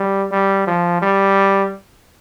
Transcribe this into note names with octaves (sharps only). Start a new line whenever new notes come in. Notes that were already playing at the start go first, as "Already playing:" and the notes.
Already playing: G3
G3
F3
G3